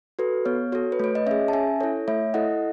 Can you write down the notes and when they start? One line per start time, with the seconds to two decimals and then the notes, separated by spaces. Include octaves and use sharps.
0.19 F#4 A4 B4
0.45 B3 C#5
0.72 F#4 A4 C#5
0.92 B4
1.00 A3 C#5
1.15 D#5
1.27 C#4 G#4 C#5 E5
1.48 A5
1.53 C#4 E5 G#5
1.80 E4 A4 C#5
2.08 A3 C#5 E5
2.34 E4 A4 D#5 F#5